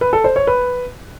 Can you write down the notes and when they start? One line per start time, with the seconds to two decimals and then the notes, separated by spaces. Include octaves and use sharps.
0.01 B4
0.13 A4
0.24 C5
0.36 C#5
0.47 B4